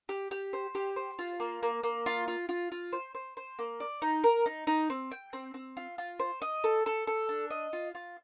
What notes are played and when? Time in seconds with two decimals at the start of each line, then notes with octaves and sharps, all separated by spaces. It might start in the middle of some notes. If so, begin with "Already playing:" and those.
0.09 G4
0.31 G4
0.53 C5
0.75 G4
0.96 C5
1.19 F4
1.40 A#3
1.63 A#3
1.83 A#3
2.06 F4
2.28 F4
2.49 F4
2.72 F4
2.93 C5
3.15 C5
3.37 C5
3.59 A#3
3.80 D5
4.02 D#4
4.24 A#4
4.46 D#4
4.67 D#4
4.90 C4
5.11 G5
5.33 C4
5.54 C4
5.77 F4
5.98 F4
6.20 C5
6.42 D#5
6.64 A4
6.86 A4
7.07 A4
7.29 D4
7.50 D#5
7.73 F4
7.95 F4